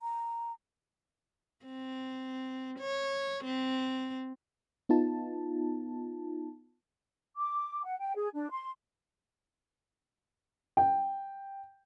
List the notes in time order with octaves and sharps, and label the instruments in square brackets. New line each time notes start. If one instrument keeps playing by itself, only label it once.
[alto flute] A#5
[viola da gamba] C4
C#5
C4
[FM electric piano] B3 D#4 F4 A5
[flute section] D6
F#5
G5
G#4
D4
C6
[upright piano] G5